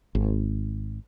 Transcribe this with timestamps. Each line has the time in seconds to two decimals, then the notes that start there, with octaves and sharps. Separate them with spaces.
0.15 G#1